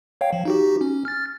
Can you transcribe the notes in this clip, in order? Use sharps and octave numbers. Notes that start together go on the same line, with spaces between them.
C#5 F5 G5
F3
D#4 F#4 G4
C#4
F6 A6